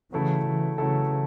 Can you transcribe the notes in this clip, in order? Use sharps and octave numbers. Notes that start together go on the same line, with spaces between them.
C#3 E3 F#3 A3 E4 A4
C#3 E3
C#3 E3 F#3 A3 E4 A4